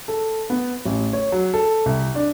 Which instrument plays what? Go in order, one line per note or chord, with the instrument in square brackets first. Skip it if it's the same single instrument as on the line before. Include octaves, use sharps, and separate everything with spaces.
[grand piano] A4
B3
A1
C#5
F#3
A4
C2
D4